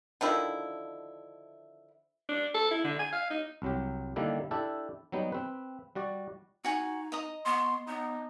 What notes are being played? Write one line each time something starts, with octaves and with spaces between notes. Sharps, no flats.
D3 D#3 F3 E4
D4
A4
E4
D3
G#5
F5
D#4
C2 F#3 G4
D3 D#3 G3 A#3 D4 E4
D4 E4 G4 A4
F#3 G3 B3 D#4
C4 B4
G3 F#4 D5
D#4 F#4 G#5
D#5 A#5 D#6
B3 C6
B3 D#4